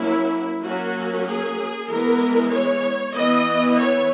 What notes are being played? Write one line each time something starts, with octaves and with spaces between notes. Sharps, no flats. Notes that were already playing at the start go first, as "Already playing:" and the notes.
Already playing: F#3 A#3 C#4 E4
F#3 A#3 C#4 F#4
G#4
E3 G#3 B3 A#4
C#5
E3 B3 D#5
C#5